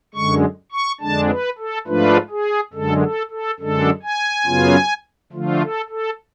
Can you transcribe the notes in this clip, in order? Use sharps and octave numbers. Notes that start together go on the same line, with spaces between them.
F#2 D3 G#3 C#6
C#6
F2 D3 G#3 D4 A5
B4
A4
G#2 F3 A3 D4 F4 B4
G#4
F#2 D3 G#3 A4
A4
A4
F#2 D3 G#3 D4 A4
G#5
F#2 C#3 F#3 B3 F4
D3 F3 A3 F4
A4
A4